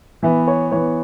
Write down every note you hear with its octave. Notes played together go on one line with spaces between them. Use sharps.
E3 B3 E5
C#5
E3 B3 C#5